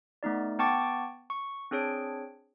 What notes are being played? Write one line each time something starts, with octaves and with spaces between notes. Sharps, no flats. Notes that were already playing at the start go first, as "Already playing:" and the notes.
A3 B3 D#4 D5
B3 G5 A5 C#6 D6 A6
C#6
C4 D4 G#4 C#5 D7